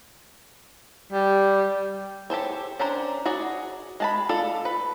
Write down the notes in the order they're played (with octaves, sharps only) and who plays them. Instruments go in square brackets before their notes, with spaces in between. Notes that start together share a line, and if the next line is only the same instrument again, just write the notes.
[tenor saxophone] G3
[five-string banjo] G4 A4 C5 C#5
C#4 D4 A#4 C5
F#4 G#4 C#5 D5
G#3 A5 B5
F4 A4 D5
B4